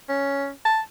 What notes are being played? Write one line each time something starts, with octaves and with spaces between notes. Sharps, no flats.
C#4
A5